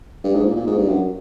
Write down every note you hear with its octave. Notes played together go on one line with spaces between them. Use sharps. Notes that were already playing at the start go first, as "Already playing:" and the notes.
G2
G#2
A#2
A#2
G#2
G2
F#2